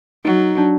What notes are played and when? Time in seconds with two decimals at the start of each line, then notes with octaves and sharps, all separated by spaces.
0.25 F#3 D#4
0.58 D4